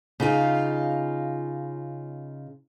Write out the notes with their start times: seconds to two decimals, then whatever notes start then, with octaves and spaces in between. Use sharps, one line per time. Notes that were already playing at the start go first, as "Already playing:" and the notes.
0.20 C#3 D#4 F4